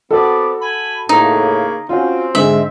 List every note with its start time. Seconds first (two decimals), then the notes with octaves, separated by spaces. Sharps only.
0.11 B3 C4 F#4 A4 D5
0.59 G#5 B5
1.09 A2 C#3 A#3 D#4
1.89 C4 C#4 F4 F#4
2.35 G#2 D3 G#3 E5